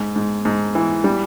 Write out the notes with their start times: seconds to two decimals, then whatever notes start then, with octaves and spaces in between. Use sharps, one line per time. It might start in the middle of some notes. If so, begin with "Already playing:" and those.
Already playing: G#2
0.16 G#2
0.45 G#2
0.75 E3
1.04 G3